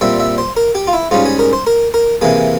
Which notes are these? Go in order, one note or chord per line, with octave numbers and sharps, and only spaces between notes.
A#2 G3 C4 E5
E5
C5
A#4
G4
F4
E4
G#2 G3 C#4 F4
G#4
A#4
C5
A#4
A#4
C3 E3 A#3 G#4